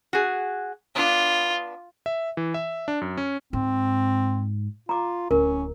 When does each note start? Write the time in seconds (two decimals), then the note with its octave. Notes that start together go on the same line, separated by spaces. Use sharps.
0.13 F#4 G#4
0.96 B3 D4 F4
2.06 E5
2.37 E3
2.54 E5
2.88 D4
3.01 F#2
3.17 C#4
3.53 G#2 C4
4.89 F4 A#5 D6
5.31 D1 C#4 A#4